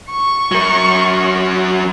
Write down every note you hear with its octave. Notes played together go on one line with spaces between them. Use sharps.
C#6
F#3 A#4